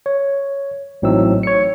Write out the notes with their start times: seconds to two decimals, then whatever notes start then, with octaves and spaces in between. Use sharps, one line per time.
0.06 C#5
1.02 A1 A2 F#3 C4 D#4 E6
1.43 C#5 C#7